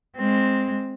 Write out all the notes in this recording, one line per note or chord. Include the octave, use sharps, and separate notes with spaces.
G#3 C4